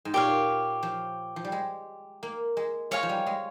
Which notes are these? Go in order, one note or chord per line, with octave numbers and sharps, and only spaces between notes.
G#2
A#2 G4 C#5 F5
F3
F3
G3
G#3
A#3
G#3
G#3 C#5 F5 G#5
F3
G3
G#3